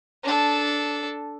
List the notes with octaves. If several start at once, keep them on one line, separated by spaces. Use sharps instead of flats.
D4 A4